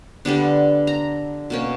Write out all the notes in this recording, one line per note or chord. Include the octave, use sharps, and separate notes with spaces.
D3 G3 B3 D4
A#5
B2 A#3 C#4